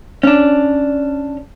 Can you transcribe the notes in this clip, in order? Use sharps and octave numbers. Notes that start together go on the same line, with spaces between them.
C#4 D4